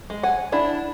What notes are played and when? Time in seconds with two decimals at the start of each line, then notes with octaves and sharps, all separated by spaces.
0.10 G#3
0.23 F#5 G#5
0.52 D4 E4